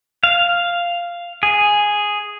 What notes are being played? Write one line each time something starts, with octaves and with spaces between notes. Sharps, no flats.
F5
G#4